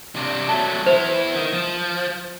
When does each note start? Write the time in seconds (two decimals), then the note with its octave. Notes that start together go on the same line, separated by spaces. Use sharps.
0.16 C3 D4
0.49 F#3 A3 A5
0.86 B3 E4 C5
1.35 D#3
1.53 F3